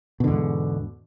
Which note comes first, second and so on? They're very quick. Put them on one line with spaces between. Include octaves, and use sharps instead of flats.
B2 D3 E2 G#2